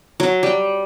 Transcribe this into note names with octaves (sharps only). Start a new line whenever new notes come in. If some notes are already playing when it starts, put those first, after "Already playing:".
F#3
G3